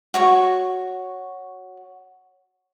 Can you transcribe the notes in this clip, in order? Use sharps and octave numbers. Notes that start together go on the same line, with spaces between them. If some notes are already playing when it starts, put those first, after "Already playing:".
F#4 C#5 C#6